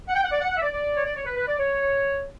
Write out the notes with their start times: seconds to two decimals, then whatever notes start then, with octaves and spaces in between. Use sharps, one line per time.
0.08 F#5
0.15 G5
0.23 F#5
0.31 D5
0.40 F#5
0.50 F#5
0.57 E5
0.61 D5
0.72 D5
0.95 C#5
1.05 D5
1.15 C#5
1.25 B4
1.36 B4
1.47 D5
1.58 C#5